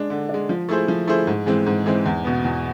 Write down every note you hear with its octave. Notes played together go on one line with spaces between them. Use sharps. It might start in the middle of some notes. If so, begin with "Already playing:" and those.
Already playing: G#3 D4
D3
G#3 D4
F3
A3 E4 G#4 C5
F3
A3 E4 G#4 C5
G#2
E3 G#3 C4
G#2
E3 G#3 C4
E2
B2 B3
E2